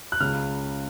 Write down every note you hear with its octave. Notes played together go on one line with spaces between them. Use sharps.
F#6
C#2 C#3 F6